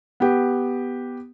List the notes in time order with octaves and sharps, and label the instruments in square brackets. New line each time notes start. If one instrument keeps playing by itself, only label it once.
[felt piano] B3 G4